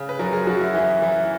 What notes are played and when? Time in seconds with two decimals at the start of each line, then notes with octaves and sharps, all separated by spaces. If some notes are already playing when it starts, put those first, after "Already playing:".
Already playing: C#3
0.09 B4
0.19 F#2 A#4
0.33 G#4
0.47 F#2 F#4
0.61 E4
0.75 E3 E4
1.02 E3